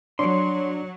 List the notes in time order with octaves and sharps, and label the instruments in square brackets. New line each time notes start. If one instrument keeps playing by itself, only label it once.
[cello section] F#3 [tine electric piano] D4 [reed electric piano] C#5 D5 [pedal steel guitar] C6